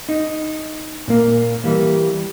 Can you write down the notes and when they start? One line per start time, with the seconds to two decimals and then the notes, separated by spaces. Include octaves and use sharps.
0.09 D#4
1.08 A#2 A#3
1.64 E3 G3 A#3